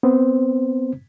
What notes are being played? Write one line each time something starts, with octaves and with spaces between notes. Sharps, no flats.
B3 C4 C5